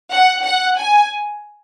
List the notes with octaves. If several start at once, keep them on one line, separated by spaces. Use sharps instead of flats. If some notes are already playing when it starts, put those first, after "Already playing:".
F#5
F#5
G#5